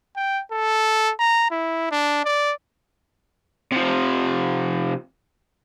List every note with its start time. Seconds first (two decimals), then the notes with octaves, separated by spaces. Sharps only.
0.16 G5
0.52 A4
1.20 A#5
1.51 E4
1.91 D4
2.25 D5
3.72 C3 F3